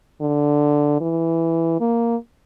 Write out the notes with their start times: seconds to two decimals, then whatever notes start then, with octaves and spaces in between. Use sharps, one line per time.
0.21 D3
1.01 E3
1.80 A#3